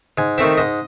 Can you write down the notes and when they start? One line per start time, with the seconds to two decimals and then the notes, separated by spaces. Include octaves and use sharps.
0.18 G#2 G#5
0.38 D#3 A3 C4 E5
0.57 G#2 D#5